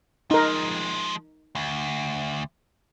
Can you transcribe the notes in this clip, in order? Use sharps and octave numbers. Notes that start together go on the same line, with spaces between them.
F3 G#3 D#4 A#4
D2